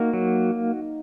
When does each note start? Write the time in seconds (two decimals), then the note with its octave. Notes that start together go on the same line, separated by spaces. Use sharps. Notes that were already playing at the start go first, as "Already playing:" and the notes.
Already playing: A#3 D#4 F#4
0.13 F#3